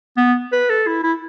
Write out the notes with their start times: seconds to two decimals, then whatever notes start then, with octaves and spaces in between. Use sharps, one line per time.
0.17 B3
0.52 B4
0.70 A4
0.87 E4
1.03 E4